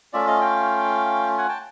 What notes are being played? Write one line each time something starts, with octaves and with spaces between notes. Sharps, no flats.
A3 C#4 F4 D5 E5
D#5 F5
F5 G5
F#5 G#5
G5 A5